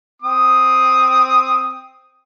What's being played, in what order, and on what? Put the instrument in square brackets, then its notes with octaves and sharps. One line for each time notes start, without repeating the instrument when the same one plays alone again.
[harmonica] C4 D#6